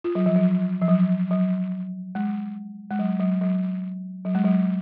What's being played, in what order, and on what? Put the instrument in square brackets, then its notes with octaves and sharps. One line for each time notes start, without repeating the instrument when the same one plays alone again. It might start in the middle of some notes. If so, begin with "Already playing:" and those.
[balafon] F4
F#3
F3
F#3
F3
F#3
F#3
G#3
G#3
F#3
F#3
F#3
F#3
G#3
F#3